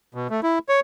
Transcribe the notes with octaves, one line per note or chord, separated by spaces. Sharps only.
B2
A3
E4
C#5